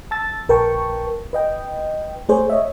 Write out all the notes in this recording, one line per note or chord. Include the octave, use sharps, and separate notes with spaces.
A5 E6 A6
A#1 A#4 B4 G5 A5 C#6
B4 D#5 G5
A3 G#4 C5 C#5
C#5 D#5 E5